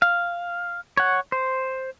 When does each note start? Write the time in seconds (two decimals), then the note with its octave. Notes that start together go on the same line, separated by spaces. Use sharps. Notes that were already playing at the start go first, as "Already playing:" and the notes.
0.02 F5
0.97 C#5 F#5
1.32 C5